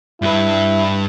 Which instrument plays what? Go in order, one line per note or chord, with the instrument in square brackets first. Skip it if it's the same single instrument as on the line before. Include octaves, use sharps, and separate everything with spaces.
[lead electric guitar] G2 B4 [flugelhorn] E4